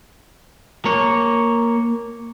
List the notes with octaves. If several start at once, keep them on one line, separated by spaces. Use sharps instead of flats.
A#3 C#5